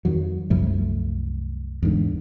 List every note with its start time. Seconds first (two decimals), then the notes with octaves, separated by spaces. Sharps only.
0.05 F2 D#3 F#3
0.50 C2 F#2 F3 A3
1.83 E2 G#2 D3